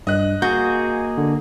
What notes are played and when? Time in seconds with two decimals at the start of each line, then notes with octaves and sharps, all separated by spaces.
0.07 G2 D#5 F#6
0.42 A#3 F#4 G#4 G6
1.18 D3